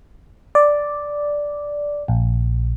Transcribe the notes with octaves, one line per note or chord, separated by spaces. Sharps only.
D5
A#1